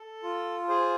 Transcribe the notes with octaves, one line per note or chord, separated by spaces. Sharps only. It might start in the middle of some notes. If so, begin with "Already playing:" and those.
Already playing: A4
F4
G#4 C5